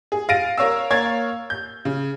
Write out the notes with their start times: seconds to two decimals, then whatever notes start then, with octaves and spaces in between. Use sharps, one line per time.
0.12 G#4
0.29 F5 A6 A#6 D7 D#7
0.58 A#4 C#5 F5 E6
0.90 A#3 C#5 F5 G#6 A6
1.50 G6
1.85 C#3